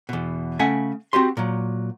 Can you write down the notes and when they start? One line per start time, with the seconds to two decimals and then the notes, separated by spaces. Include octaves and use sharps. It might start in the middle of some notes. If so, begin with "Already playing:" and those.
0.09 E2 B2
0.59 C#3 A3 E5 F#5 G#5
1.13 C4 F#4 G4 C6
1.37 A#2 F#3